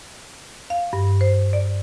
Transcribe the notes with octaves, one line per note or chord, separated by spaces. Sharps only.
F5
G2
C5
D5